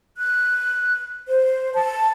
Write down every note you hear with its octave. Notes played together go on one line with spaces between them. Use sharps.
F#6
C5
A5